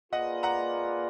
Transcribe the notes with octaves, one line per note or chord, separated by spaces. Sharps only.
A#3 F4 G#4 B4 D5 D#5 F#5
F#5 A#5